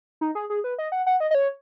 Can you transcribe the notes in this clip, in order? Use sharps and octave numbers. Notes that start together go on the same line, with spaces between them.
D#4
G#4
G#4
B4
D#5
F#5
F#5
D#5
D#5
C#5